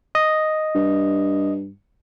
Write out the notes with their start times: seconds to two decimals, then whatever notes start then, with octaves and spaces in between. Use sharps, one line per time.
0.15 D#5
0.75 G2